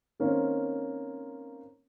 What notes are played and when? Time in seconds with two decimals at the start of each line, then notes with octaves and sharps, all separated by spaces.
0.20 D#3 A#3 C4 C#4